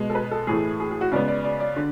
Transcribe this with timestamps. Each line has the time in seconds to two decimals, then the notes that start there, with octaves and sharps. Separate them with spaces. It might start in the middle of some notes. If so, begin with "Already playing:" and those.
Already playing: B2 G#3 B3
0.10 A4
0.15 B4
0.31 A4
0.47 A2 E3 A3 G#4
0.80 G#4
0.91 G#4
1.01 F#4
1.11 C#3 G#3 B3 D5
1.28 D5
1.44 D5
1.60 D5
1.76 D3